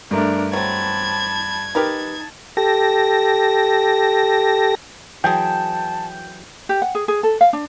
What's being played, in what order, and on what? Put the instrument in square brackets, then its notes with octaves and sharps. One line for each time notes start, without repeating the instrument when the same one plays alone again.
[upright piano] G2 A3 [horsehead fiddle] D4 A#4
[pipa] F#3 C4 [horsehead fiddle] A5 B5 [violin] G#6
[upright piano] D#4 [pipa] G4 A#4 B4 [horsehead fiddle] A5
[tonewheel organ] G4 A4 A#6
[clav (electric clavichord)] E3 F#3 G#4 [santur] G5 [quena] A5
[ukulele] G4
F#5
G#4
G#4
A4
F5
D4